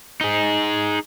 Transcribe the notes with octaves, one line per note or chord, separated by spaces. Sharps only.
D#4 G#4